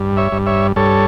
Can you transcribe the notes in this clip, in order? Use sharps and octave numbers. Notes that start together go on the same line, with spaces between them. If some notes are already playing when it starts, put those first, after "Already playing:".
Already playing: G2
C#5 E5
G2
C#5 E5
G2 A4 C#5